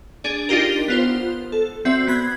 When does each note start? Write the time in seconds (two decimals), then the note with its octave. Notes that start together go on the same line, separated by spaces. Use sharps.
0.24 D4 G#4 D5
0.49 D4 D#4 F4 G4 A#4
0.88 B3 F4 C5
1.52 A4
1.85 C4 F#4 D5 E5
2.07 B3 B5 G#6